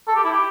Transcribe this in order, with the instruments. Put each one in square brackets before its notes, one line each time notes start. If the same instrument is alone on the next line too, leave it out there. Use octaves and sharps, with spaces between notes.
[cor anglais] A4
G4
E4
G4